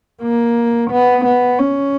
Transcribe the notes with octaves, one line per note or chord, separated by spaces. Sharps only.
A#3
B3
B3
C#4